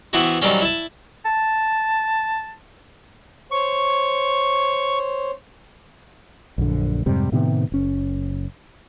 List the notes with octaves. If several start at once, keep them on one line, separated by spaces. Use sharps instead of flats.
E3 B3 C4 E4 F#4
D#3 F#3 G3 C4 C#4
E4 A5
A5
C5 C#5 C#6
A#1 F#2 D3
F2 G#2 C3 G3
A2 C3 D#3 B3
F#1 C#4